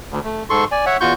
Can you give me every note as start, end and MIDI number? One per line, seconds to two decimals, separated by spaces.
0.11 0.20 38
0.24 0.43 57
0.50 0.65 44
0.50 0.65 69
0.50 0.65 84
0.50 0.65 85
0.72 0.85 74
0.72 0.85 80
0.86 0.97 73
0.86 0.97 76
0.86 0.97 78
1.01 1.13 40
1.01 1.13 65
1.01 1.13 66
1.01 1.13 85
1.01 1.13 91